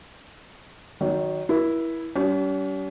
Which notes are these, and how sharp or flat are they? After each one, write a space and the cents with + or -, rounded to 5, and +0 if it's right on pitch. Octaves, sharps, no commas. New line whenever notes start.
D#3 +0 F#3 +0 C#5 +40
E4 +0 A#4 +45
G3 -40 C#4 +40